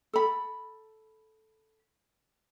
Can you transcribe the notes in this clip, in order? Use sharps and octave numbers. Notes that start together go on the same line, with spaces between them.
A4 B5